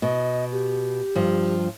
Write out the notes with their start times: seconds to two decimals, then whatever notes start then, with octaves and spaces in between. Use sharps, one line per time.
0.02 B2 D#5
0.52 G4
1.15 G2 F3